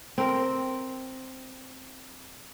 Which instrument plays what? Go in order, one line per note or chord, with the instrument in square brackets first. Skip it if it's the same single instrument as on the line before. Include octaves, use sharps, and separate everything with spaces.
[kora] C4 A#4